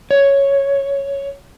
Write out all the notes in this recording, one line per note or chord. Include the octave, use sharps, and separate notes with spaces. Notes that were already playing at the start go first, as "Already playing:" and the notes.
C#5